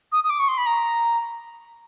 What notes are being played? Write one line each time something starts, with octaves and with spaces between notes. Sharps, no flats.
D#6
D#6
D6
C#6
C6
B5
A#5